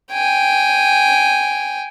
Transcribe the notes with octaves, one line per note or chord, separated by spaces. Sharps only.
G5 G#5